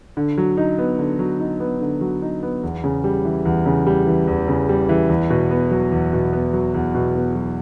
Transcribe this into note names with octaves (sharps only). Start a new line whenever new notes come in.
D3
F#3
D#4
B3
D3
F#3
D#4
B3
D3
F#3
D#4
B3
E2
C#3
G3
E3
E2
C#3
G3
E3
E2
C#3
G3
E3
E2
B2
B3
F#3
E2
B2
B3
F#3
E2
B2
B3
F#3